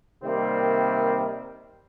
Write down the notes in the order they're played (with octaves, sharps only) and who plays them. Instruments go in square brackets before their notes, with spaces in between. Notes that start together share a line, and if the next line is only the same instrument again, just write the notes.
[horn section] C3 D#3 G3 A#3 C4